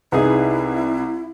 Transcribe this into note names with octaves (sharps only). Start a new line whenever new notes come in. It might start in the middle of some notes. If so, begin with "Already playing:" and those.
C2 B3 D#4 E4 G#4